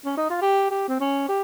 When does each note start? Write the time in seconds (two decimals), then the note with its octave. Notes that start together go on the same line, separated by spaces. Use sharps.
0.05 C#4
0.17 D#4
0.29 F4
0.41 G4
0.71 G4
0.88 C4
1.00 C#4
1.28 G4